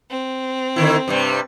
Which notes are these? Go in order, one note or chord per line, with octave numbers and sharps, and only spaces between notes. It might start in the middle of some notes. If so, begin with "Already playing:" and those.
C4
D3 D#3 E4
G2 C3 G3